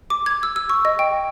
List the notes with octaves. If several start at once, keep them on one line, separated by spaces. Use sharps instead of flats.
D6
G#6
E6
E6
C#6
D#5
G5